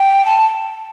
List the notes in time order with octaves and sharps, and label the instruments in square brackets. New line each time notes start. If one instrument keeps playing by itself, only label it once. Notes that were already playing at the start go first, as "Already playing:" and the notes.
Already playing: [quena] G5
A5